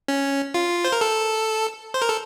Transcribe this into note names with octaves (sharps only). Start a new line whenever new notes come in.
C#4
F4
C5
A#4
A4
C5
A#4
A4